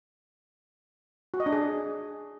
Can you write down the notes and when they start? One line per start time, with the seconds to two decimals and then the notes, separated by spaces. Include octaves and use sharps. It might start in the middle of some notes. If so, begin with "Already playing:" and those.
1.34 F#4
1.40 D#5
1.46 D4
1.52 G#4